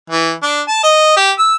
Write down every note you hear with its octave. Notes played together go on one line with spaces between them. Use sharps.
E3
D4
A5
D#5
G4
E6